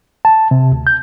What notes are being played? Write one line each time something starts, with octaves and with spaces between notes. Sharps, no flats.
A5
C3
D2
G6